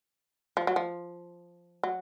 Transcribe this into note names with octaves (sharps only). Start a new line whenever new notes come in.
F3
F#3
F3
F#3